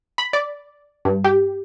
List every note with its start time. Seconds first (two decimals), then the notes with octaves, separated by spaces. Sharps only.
0.18 B5
0.33 D5
1.05 G2
1.24 G4